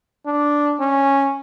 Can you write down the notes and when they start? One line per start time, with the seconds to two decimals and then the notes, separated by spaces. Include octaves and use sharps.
0.26 D4
0.80 C#4